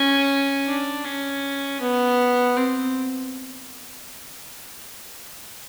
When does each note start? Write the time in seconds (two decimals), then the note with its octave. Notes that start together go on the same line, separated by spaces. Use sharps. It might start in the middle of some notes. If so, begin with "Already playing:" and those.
Already playing: C#4
0.67 D4
1.04 C#4
1.81 B3
2.57 C4